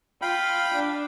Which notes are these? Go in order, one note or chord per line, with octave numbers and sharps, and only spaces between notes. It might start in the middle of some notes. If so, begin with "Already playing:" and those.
F4 F5 G5 B5
D4